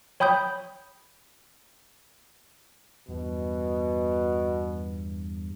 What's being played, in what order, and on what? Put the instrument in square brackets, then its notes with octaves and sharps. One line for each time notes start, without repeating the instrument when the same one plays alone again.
[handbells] C#5 G5 B5 D#6 G6
[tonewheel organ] E2 G2 [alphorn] B2